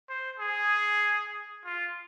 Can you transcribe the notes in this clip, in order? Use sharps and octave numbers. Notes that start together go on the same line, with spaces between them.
C5
G#4
F4